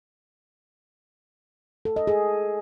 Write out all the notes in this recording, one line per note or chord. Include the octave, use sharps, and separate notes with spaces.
A4
D#5
G#4